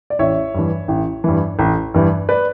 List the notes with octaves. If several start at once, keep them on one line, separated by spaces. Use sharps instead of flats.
D5
A1 C#5 E5
G2 E3
A1
G2 E3
A1
G2 E3
B4 D5